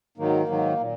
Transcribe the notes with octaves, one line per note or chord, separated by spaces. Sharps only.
G#2 D#3 F#3 A#3
G#2 D#3 F#3
A#2